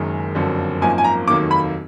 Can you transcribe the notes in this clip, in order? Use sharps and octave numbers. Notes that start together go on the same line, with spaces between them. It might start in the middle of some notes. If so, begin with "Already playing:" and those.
Already playing: F#1 F#2 D#3 G#3
F#1 F2 D3 F#3
G#1 F#2 F3 A#3 G#5
G#5
A#5
F1 D#2 D#3 F#3 A#3 D6
B5